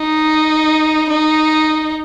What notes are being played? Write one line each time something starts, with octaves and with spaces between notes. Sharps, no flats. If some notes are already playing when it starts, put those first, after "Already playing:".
Already playing: D#4
D#4